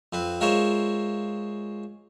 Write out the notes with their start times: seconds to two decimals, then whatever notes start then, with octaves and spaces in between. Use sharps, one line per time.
0.13 F2 C4 B4
0.41 G#3 F4 A#4 C5 C#5 E5